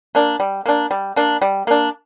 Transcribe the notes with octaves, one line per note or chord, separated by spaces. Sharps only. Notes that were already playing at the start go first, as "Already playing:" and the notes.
A#3 D4
G3
A#3 D4
G3
A#3 D4
G3
A#3 D4